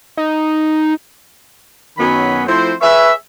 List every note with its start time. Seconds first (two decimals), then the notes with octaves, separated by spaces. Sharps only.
0.17 D#4
1.98 F#2 D#3 F#3 B3 C#4 B5
2.47 F3 A3 C4 E4 C5
2.81 G#4 B4 C#5 E5